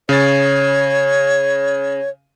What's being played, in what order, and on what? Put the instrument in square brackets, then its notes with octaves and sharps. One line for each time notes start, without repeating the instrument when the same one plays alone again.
[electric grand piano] C#3 A6 [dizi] C#5